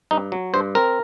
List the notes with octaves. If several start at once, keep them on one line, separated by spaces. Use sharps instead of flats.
G2 D#4
F#3
G2 C5
C4 A#4